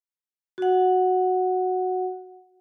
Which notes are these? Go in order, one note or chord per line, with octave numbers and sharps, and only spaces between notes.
F#4 F#5